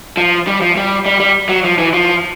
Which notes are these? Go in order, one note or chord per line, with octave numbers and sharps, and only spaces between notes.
F3
G3
F3
G3
G3
G3
F#3
F3
E3
F3